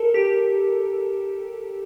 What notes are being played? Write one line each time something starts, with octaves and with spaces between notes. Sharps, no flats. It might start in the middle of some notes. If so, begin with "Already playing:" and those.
Already playing: A4 A#4
G4